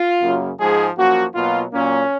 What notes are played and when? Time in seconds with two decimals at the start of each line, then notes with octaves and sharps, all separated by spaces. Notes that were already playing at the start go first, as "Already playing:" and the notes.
Already playing: F4
0.21 F#2 C#3 F#3 A#3
0.59 G#2 F3 G#3 G#4
0.96 F#2 F3 A#3 F#4
1.34 B2 F#3 A#3 F4
1.72 A#2 F#3 A#3 C#4